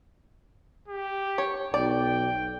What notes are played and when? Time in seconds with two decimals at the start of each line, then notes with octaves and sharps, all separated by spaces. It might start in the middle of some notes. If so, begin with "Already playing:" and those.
0.88 G4
1.38 C#5
1.74 B1 D5 G5